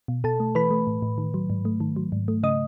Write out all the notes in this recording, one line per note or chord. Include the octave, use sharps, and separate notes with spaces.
B2
B2 A4 A5
A3
E3 B4 B5
A3
A2
A2
D#3
F#3
G#2
A3
D#3
F#3
G#2
A3
C#3 D#5 D#6